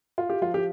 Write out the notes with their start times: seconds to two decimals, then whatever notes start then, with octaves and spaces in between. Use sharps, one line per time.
0.18 F4
0.30 G4
0.42 F3 F4
0.54 G4